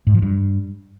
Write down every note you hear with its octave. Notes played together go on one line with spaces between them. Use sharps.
G#2
F3
G2